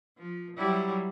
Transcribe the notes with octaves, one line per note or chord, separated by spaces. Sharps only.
F3
F#3 G3 E4